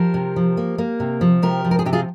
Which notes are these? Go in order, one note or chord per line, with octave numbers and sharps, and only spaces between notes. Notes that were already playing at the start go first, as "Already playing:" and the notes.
Already playing: F3 G4 A#4
C3
F3
A#3
A#3
C3
F3
C3 G4 A#4
F3
A#4
G#4
C3 G4
F4 G#4